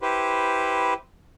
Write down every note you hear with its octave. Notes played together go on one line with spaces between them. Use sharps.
E4 G4 B4 C5